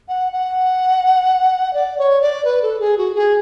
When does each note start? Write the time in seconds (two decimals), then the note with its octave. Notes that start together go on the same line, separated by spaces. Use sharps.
0.09 F#5
0.32 F#5
1.73 D5
1.98 C#5
2.22 D5
2.45 B4
2.62 A4
2.80 G#4
2.98 F#4
3.15 G#4